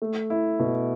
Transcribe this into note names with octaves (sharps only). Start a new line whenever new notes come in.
A3
E4
B2